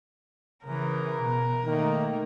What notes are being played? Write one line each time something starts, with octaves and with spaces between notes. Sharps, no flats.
C#3 E3 A#4
B2
D#3 A3 A#3